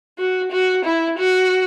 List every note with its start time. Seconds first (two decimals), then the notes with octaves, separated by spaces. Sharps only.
0.18 F#4
0.51 F#4
0.85 E4
1.18 F#4